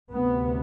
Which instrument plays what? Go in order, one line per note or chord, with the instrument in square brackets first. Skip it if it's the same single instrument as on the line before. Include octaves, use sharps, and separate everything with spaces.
[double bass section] D2 C3 B3